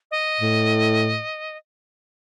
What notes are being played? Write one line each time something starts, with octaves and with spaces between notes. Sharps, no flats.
D#5
A2